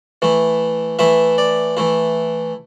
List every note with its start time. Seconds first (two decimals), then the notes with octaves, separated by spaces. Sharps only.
0.22 E3 A3 E4
0.99 E3 A3 E4 E5
1.38 D5
1.77 E3 A3 E4